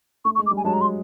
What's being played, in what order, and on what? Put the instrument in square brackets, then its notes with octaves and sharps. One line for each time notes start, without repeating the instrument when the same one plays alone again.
[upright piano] A3 [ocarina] C#6
[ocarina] C#6
[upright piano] G#3
[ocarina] D6
[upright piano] G3
[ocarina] G#5
[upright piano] F#3 G#3 [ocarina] A5
[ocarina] A#5
C6